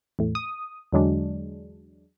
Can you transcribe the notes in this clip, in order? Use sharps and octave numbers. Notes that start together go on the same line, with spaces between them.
E2 A2
D#6
E2 D3 F#3 G#3 D4